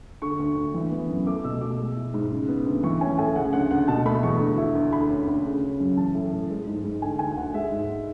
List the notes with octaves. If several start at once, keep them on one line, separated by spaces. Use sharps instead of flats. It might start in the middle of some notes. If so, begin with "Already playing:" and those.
D3 C#6
D2
D2
E3
B3
F#2
A3 D6
B2 E6
B2 D6
G#3
E4
G#2
C#3
B3
D2
E3 C#6
C#4 G#5
A2 G#5
C#3 F#5
D2 F#5
D2 F#5
B2 A5
A3 B5
E2 C#6
D3
E4
D2
D3 B5
C#4
D2
C#3
C#4
F#2
E3 A5
A2
A2
G#3
G#2
G#2
D3 G#5
D2 G#5
D2 F#5
G#3 E5
G#2